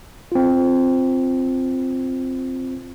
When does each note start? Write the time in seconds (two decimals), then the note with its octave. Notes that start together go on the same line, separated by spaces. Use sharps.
0.32 C4 F4